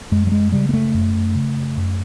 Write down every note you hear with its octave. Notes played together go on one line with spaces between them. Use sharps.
F#2 G#3
G3
G#3
C#3 G3
A#3
A3
F#2
C#3
F#2